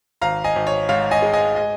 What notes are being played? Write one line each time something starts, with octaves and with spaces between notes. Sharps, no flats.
G#1 F5 A#5
D#5 G#5
G#1
C#5
G#2 C#5 F5
D#5 G#5
G#3
D#5 G#5
D#5 G#5